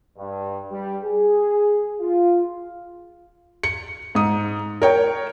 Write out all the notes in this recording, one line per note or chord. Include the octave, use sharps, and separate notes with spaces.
G2
G3
G#4
F4
C#7
G#2 D#6
A#4 C#5 G5